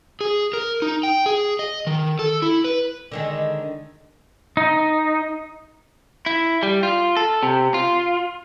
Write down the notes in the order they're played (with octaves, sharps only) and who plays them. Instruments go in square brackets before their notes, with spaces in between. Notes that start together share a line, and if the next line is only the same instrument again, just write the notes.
[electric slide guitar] G#4
A#4
D#4
G5
G#4
D#5
D#3
A4
E4
B4
[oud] D3 D#3 G#3
[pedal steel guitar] D#4
[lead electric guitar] E4
G3
F4
A4
C3
F4